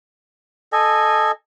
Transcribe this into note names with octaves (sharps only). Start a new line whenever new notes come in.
A4 D#5 G#5